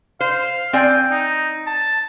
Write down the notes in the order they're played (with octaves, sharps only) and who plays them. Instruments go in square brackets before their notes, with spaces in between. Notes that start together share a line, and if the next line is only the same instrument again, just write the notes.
[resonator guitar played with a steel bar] C5 [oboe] F5
[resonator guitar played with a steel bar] C4 D5 G#5 [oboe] G5
[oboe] D#4
A5